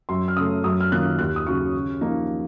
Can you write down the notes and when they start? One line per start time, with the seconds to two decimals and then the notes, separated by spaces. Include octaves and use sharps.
0.09 F#2 C6
0.28 F6
0.37 C#3 A3 D#6
0.64 F#2 D#6
0.80 F6
0.92 D#3 A#3 C#4 F4 F#6
1.19 D#2 F#6
1.36 D#6
1.47 C#3 F#3 C#6
1.74 C#3
2.01 F3 A#3 D#4